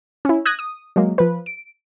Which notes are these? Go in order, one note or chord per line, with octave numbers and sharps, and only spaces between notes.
C#4 E4
D#6 F#6 G#6 A#6
D#6
F#3 G#3 A#3
F3 B4
D7